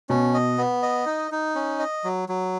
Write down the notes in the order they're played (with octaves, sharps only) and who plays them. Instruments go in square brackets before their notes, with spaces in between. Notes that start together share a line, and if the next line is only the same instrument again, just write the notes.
[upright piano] B2 [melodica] C#4
[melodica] D#5
B3
D#5
D#4
D#4
C#4
D#5
F#3
F#3